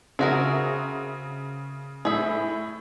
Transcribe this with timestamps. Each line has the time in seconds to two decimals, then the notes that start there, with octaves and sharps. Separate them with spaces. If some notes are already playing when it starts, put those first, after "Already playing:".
0.19 C#3 C4 F#4 A#4 E5
2.05 A2 G#4 E5